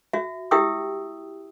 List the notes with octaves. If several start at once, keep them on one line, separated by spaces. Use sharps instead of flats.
F#4 E5
E4 G4 E5 G5 D#6 E6